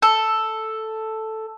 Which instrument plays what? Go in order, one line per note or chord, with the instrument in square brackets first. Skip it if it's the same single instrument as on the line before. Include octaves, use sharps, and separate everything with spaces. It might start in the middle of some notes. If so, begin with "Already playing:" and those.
[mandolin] A4